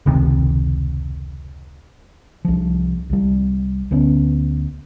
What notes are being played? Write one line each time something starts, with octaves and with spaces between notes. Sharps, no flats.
F1 C#2 C3 D#3
C2 F3
C2 G3
D2 B3 C#4